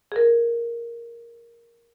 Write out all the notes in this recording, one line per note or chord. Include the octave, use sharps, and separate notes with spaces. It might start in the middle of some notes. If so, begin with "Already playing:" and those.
G#4 A#4